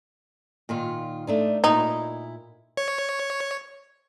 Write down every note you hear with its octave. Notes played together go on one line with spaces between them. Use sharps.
A#2 D#3 F4
A3 D4 D#4
A#2 D#4 E4
C#5